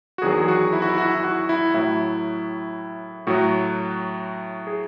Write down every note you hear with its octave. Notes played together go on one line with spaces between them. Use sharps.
F#4
E2 D#3 F#3 G#4
G#4
F#4
E4
F#4
E4
F#4
E4
F#4
E4
A2 F#3 E4
A2 F#3 F#4
G#4